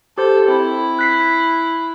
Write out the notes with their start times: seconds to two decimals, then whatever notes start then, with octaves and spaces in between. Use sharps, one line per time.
0.18 G4 A4 C5
0.48 C4 E4
0.99 F#6 B6 C7